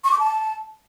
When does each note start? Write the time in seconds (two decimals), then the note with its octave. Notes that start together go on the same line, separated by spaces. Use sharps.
0.04 C#6
0.11 D6
0.19 A5